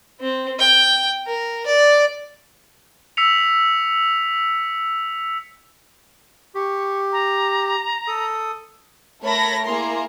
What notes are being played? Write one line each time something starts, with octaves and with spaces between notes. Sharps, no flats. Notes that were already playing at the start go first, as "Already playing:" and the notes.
C4
G5
A#4
D5
E6 B6 C#7 F7
G4 C#6
A#5
A4 D#6
A3 A#4 C#5 A5 B5 A#6
A#3 E4 G#4 A#5 C6